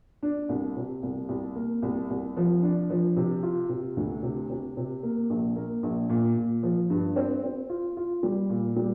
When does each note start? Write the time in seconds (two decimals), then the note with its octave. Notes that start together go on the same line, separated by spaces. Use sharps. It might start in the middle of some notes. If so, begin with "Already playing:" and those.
0.23 D4
0.49 C2
0.76 C3
1.03 C2
1.29 C2
1.56 A#3
1.82 C2
2.10 C2
2.37 F3
2.63 D4
2.90 F3
3.16 C3
3.43 F4
3.69 C3
3.97 D2
4.23 C3
4.50 C3
4.77 C3
5.03 A#3
5.30 A#1
5.56 A#3
5.83 A#1
6.09 A#2
6.37 A#2
6.63 F3
6.90 G2
7.16 C4
7.43 C4
7.69 F4
7.97 F4
8.23 G3
8.50 A#2
8.76 G3